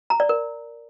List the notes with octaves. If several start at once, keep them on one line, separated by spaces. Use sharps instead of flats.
A#5
D5
A#4